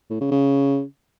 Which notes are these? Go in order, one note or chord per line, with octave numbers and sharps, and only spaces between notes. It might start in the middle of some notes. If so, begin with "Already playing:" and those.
A2
C#3
C#3